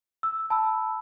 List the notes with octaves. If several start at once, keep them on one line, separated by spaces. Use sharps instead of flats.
E6
A5 B5 E6